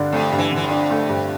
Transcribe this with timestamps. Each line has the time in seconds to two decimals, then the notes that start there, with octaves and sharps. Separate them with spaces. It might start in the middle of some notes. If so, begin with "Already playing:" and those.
Already playing: G2 D3 D4
0.13 F2 A3
0.32 G2
0.39 E3
0.52 D3 E3
0.64 F2
0.71 D4
0.91 A3
1.09 G2